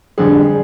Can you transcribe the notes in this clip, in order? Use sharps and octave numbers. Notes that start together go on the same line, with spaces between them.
F2 D3 G3 G#4